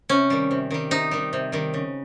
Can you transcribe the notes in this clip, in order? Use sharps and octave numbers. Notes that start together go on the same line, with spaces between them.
C3 C#4
D#3 G3
C3
D#3 G3
C3 D#4
D#3 G3
C3
D#3 G3
C#3